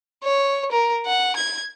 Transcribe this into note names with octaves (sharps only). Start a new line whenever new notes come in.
C#5
A#4
F#5
G#6